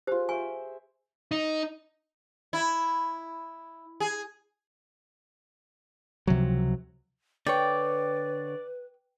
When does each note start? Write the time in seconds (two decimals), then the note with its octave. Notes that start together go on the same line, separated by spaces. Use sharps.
0.07 F4 G4 G#4 C5
0.29 C5 E5 G#5 C#6
1.31 D#4
2.53 E4
4.00 G#4
6.27 C#2 C3 F3 F#3
7.47 D3 B4 C#5 D5 G5